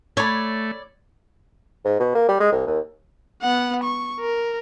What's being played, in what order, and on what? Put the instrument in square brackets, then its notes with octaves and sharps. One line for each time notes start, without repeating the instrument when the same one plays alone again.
[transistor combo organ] A3 [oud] C#5 [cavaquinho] D5 B5
[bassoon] G#2
B2
A#3
G3
G#3
C2
D#2
[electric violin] B3 F#5
C#6
A#4